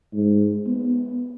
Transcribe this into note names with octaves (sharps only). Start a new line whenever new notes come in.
G#2
B3